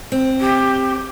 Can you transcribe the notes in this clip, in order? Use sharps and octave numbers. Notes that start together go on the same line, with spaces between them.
C4
G4